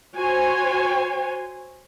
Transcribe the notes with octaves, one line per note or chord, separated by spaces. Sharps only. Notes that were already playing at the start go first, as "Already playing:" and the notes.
F#4 C5 C#5 G#5